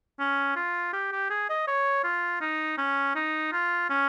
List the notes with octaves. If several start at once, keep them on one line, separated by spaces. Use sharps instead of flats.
C#4
F4
G4
G4
G#4
D#5
C#5
F4
D#4
C#4
D#4
F4
C#4